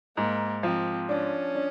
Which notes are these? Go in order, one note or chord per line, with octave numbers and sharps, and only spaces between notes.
G#2 A#3
F3 C4
C#4 D4
D4